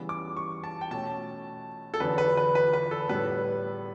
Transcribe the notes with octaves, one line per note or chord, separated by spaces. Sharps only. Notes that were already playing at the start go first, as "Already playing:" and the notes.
Already playing: C#3 E3 G3 B3
D6
C#6
A5
G5
B2 A3 C#4 A5
A4
E2 D3 F#3 B4
B4
B4
B4
B4
A4
A2 G3 B3 B4